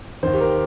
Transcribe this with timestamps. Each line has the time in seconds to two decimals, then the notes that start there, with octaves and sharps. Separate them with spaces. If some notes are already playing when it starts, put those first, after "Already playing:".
0.23 D#2 D#3 C5
0.33 G4
0.41 A#4